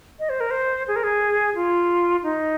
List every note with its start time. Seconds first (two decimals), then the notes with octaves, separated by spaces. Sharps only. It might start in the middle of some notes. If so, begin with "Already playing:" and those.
0.19 D#5
0.29 C5
0.40 A#4
0.51 C5
0.88 G#4
0.96 A#4
1.04 G#4
1.55 F4
2.23 D#4